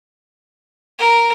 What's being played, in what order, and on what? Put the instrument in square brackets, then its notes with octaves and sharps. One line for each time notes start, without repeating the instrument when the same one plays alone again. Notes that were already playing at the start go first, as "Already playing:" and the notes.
[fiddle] A#4